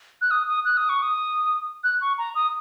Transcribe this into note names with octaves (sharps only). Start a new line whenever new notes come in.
F#6
D#6
D#6
F#6
D#6
C#6
D#6
F#6
C#6
A#5
D#6